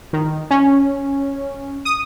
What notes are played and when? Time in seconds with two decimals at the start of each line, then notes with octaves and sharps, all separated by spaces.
0.13 D#3
0.51 C#4
1.85 D#6